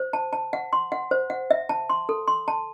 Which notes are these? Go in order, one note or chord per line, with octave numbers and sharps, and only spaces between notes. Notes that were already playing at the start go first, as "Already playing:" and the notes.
Already playing: C5
A5
A5
F#5
C6
F#5
C5
F#5
E5
A5
C6
A4
C6
A5